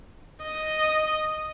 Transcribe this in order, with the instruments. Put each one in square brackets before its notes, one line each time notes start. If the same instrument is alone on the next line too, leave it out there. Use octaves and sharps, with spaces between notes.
[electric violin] D#5